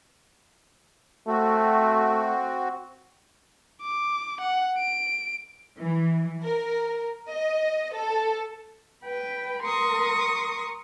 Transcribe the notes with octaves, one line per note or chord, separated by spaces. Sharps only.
A3 C4 F#4
D6
F#5
D7
E3
A#4
D#5
A4
B4 G5
A#4 C6 C#6 D#6